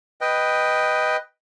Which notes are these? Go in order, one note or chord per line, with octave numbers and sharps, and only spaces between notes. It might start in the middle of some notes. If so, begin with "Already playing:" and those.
B4 D#5 G5